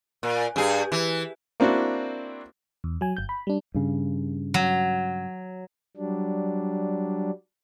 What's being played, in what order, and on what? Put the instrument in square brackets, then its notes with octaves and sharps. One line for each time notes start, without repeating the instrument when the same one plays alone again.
[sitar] A#2
G2 G#4
E3
[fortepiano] A#3 C4 D4 E4 F#4
[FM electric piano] E2
F#3 G#5
G1 G6
B5
G3 D4
[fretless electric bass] G2 C#3
[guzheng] F#3
[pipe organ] F#3 G3 D4